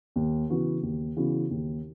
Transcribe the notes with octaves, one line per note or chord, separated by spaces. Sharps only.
D#2
C#3 E3 B3 F#4
D#2
C#3 E3 B3 F#4
D#2